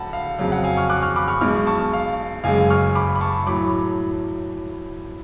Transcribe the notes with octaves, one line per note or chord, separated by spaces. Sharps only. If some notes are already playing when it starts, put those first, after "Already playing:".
Already playing: D2 D3 F#3 F#5 A5 B5
F5
F2 C#3 F#3 F5
F#5
F5 G#5
C#6 F6
D6 F#6
C#6 F6
B5 D6
C#6 F6
B1 B2 G#3 C#6 F6
A5 C#6
F5
F#1 F#2 C#3 G#3 F5 G#5
C#6 F6
B5 D6
B5
A5 C#6
A2 F#3 B5 D6